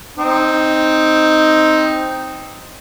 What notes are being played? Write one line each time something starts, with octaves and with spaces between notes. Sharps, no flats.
C4 D#4